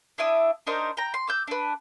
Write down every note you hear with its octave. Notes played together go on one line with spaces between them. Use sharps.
D4 E4 E5 D#6
D4 D#4 A#4 C5
G5 A#5
C6
D6 E6 G6
D4 B4